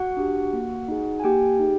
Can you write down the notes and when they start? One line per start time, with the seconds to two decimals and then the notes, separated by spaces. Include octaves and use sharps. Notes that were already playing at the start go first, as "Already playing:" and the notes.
Already playing: F#4 F#5
0.17 D4 G4
0.53 A#3
0.88 D#4 G#4
1.20 G#5
1.24 A#3 G4 G5
1.59 D#4 G#4